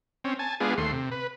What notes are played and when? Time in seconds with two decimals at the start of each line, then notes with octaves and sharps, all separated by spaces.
0.24 C4 C#4
0.39 G#5 A5
0.60 G#3 B3 D4 F4 G#4
0.78 D#2 A3 C6
0.92 C3
1.11 B4